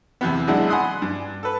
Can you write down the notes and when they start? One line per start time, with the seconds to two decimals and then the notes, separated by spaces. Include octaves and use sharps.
0.21 E2 C3 B3
0.48 B1 G#3 D4 E4 F#5
0.69 F#5 G#5 B5 C6 D#6 F#6
1.02 G2
1.43 A4 B4